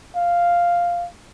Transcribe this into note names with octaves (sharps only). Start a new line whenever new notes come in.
F5